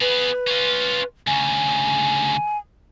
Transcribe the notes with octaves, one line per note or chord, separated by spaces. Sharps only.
B3 G#4 B4
C#4 F4
D2 C#3 G#5